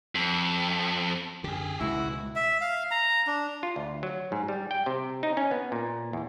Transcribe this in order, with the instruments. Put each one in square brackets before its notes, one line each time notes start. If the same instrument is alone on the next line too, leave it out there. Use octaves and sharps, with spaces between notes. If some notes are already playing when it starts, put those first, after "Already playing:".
[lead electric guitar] F2
[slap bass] F#2 D3 [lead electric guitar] G4 G#4
[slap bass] C#2 [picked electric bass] B2 D#3 G#3 [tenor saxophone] E4 [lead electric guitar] F#4
[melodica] E5
F5
A#5
D4
[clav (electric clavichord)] F4
D2
F#3
G#2
G3
G5
C3
D#4
C#4
B3
A#2
E2